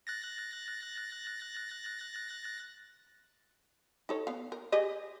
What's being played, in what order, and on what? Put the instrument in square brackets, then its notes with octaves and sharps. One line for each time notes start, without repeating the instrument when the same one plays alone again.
[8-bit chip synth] F#6 A6 A#6
[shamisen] D#4 A4 C#5
B3 F5
A#4
G4 G#4 D#5